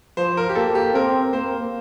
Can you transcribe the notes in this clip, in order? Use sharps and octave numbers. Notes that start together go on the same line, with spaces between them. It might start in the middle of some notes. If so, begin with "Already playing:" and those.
F3 C5
A#4
G4
A#3 A4
G4
C4 A#4
A#3 C5